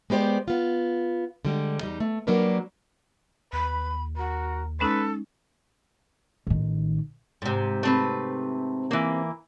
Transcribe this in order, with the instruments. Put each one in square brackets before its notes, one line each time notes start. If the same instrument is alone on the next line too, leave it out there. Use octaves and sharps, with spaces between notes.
[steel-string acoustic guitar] G#3 B3 G4 C5 D5
B3 F4
D3 G3 G#3
E2 G3 D#4
A3
F#3 G3 A#3 D4 A#4 B4
[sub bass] D#2 [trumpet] B4 [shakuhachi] B5
[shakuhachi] F#4 [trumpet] A#4
[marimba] G#3 C#4 D#4 [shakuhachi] A4 [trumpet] B4
[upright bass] A1 D#3
[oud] G#2 C3
[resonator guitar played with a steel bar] A3 C4 B4
E3 A#3